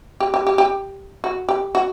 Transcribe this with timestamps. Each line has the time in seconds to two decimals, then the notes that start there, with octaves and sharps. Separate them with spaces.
0.20 G4
0.34 G4
0.47 G4
0.58 G4
1.24 F#4
1.49 G4
1.75 F#4